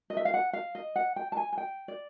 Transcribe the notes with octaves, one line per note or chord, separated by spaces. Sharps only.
D#5
E5
F5
F#5
F5
D#5
F#5
G5
A5
G#5
G#5
G5
D5